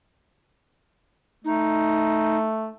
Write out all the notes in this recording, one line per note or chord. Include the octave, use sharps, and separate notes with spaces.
A3 D#4